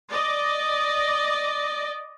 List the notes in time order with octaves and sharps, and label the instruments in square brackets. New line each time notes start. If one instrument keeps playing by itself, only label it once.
[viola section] D5 D#5